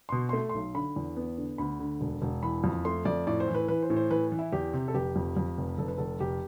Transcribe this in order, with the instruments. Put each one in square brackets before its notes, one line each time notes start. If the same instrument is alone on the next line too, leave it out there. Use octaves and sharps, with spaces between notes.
[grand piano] B2 C6
A3 C6
B1 C6
D3 B5
E2
B3
D3
D2 B5
D3
E1
E1
E3 B5
F2
A3 C6
F2 D5
A2 D5
C5
E3
B4
E3 B4
C5
A2
C5
E3 B4
E3
E4
E2 G4
C3
A4
F1 G4
F2
F2
F1
F1 A4
B4
F1 A4
F1 G4